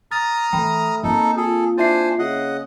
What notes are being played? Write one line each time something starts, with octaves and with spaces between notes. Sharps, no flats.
A#5 D#6 F6 A6
E3 A3 G5 B5
A#3 C4 D#4 A4
F4 G#4 A4
D4 E4 C5 E5 G#5 C7
C#3 D#5 F#5